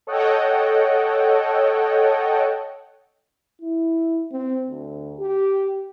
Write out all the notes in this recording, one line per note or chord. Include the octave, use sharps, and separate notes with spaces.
A4 C#5 D#5 F#5 G5
E4
C4
D2
G4